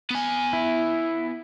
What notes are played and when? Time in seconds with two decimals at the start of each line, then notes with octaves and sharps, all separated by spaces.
0.11 B3 G#5
0.53 E4